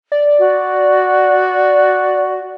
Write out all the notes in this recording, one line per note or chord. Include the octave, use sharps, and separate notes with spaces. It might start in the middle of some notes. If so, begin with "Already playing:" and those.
D5
F#4